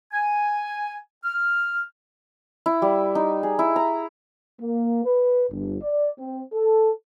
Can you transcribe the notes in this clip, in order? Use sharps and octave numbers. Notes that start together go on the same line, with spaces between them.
G#5
F6
E4
G3
D#4
G#4
E4
A#5
A#3
B4
G1
D5
C4
A4